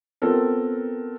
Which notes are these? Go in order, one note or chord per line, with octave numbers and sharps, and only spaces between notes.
B3 C4 F4 A4 A#4